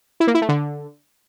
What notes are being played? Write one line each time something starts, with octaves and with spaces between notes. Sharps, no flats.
E4
A#3
E4
A3
D3